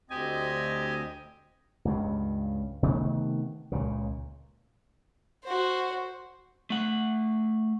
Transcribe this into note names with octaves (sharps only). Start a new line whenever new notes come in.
D2 C4 G4 D#5 G#5
C#2 G2 C#3
C3 D#3 A3 B3
C#2 A#2 C#3
F#4 C5
A3 F#5